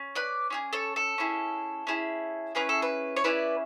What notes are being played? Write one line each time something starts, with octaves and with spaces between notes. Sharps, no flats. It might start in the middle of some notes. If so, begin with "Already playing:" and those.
Already playing: C#4
B4 D5
C#4 E4 G#4
A4 C#5
A4
C#4 E4 G#4
C#4 E4 G#4
C#4 E4 G#4 B4
A4
B4
C#5
C#4 E4 G#4 B4 D5